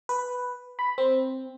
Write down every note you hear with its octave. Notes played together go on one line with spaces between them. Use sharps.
B4
B5
C4